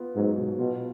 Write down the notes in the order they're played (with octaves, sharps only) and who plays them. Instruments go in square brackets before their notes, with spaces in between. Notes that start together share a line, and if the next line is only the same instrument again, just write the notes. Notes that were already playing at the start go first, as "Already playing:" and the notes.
Already playing: [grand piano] B3 F4
[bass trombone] G#2 [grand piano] F#3
[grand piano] B2
[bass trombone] B2 [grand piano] F4